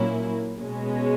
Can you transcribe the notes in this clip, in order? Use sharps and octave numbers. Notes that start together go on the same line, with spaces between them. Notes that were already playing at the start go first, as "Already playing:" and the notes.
Already playing: A#2 F#3 A#3 C#4 E4
B2 G#3 C#4